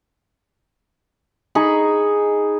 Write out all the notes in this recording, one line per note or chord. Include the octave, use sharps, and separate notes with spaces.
D#4 G#4 B5 C#6